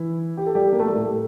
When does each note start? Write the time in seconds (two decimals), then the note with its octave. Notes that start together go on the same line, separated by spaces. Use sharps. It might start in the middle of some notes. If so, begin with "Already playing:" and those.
Already playing: E3 E4
0.37 G4
0.46 A4
0.55 G3 G4
0.73 A#3
0.80 A3
0.88 G3
0.95 A2 A3